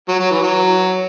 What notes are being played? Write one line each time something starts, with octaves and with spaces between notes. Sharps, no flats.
F#3
F#3
E3
F#3